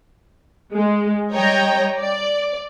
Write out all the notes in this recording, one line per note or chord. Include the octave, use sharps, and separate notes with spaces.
G#3
G3 C#5 D#5 G5 A#5
D5